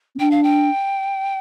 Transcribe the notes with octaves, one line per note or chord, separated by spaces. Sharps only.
C4
D4 G5
F5
G5